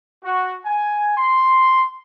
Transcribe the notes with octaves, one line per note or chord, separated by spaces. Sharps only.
F#4
G#5
C6